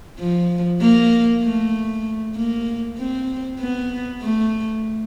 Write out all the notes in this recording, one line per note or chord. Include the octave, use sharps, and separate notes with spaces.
F3
A#3
A3
A#3
C4
B3
A3